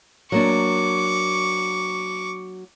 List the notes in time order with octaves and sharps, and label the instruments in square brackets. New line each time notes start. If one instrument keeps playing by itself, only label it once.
[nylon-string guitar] F#3 A#3 D4 [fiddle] C#6 D6